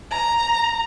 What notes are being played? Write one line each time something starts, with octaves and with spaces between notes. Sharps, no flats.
A#5